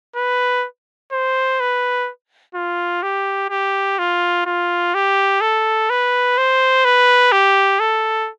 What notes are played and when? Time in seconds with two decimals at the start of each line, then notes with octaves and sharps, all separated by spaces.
0.16 B4
1.12 C5
1.60 B4
2.55 F4
3.03 G4
3.50 G4
3.99 F4
4.46 F4
4.94 G4
5.41 A4
5.90 B4
6.37 C5
6.85 B4
7.32 G4
7.80 A4